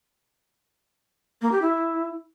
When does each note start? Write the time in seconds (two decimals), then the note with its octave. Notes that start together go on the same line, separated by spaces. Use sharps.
1.41 A#3
1.51 G4
1.61 E4